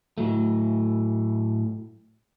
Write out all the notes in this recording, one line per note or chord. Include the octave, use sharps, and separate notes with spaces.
A2 F#3 A3